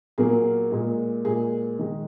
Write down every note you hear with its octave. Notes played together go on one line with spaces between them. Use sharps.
A#2 F#3 A#3 G#4
A#2 G#3
A#2 G#3 G#4
D#3 G#3